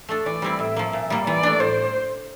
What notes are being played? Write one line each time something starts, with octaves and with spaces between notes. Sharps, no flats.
A3 D4 A4
E3 D5
G3 C4 E4
A2 E5
F3 A#3
A#2
G3 A#3
E3 D5
A3 D4
A2 C5